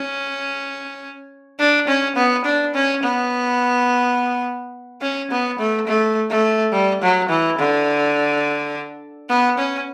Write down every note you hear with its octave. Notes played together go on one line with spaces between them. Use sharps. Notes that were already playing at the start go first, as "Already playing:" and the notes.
Already playing: C#4
D4
C#4
B3
D4
C#4
B3
C#4
B3
A3
A3
A3
G3
F#3
E3
D3
B3
C#4